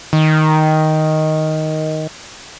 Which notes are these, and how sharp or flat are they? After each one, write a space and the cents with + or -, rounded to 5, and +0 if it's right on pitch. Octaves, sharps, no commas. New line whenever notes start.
D#3 +5